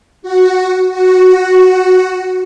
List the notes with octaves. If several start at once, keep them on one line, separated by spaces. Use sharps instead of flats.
F#4
F#4